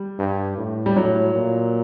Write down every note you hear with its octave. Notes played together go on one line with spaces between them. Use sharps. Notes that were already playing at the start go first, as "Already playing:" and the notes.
Already playing: G3
G2
A2
G3
A2 F#3
A#2